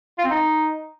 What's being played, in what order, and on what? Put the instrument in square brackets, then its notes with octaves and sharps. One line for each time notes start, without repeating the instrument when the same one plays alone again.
[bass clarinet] F4
C4
D#4